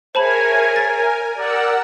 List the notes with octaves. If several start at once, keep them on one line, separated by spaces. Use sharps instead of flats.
G#4 A#4 C5 C#5 E5 G#5 A5 B5
A6
G4 A#4 D5 F#5 E6